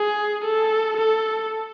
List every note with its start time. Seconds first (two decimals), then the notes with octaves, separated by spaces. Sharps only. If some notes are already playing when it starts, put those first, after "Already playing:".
Already playing: G#4
0.44 A4
0.97 A4